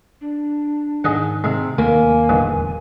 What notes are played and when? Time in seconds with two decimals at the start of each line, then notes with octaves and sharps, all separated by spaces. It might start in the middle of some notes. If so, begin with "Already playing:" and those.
0.21 D4
1.04 G#2 D#3 G#4 D#5 F#5
1.44 C3 G#3 E5
1.78 D#2 C3 A#3 G#5
2.29 D1 E2 G2 D#3 E3